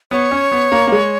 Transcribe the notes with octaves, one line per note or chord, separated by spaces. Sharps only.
B3 C#5
C#4
B3
A#3
A#3
G#3